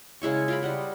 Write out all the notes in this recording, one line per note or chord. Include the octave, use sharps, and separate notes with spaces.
C#3 G#3 E4 C#6
F4 A#4 B5
G3 D#5 F#5